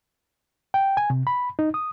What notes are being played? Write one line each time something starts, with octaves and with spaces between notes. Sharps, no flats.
G5
G#5
C3
B5
D#4
D#6